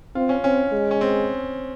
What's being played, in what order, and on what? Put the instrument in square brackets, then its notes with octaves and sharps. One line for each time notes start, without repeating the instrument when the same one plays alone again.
[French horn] C4 [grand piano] F4
[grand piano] C#4
[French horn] C4 [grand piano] C#4
[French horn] G#3
[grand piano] C#4
C4